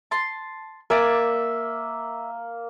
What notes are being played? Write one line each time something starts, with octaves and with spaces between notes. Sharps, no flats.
A5 C6
A#3 D5 E5 G#5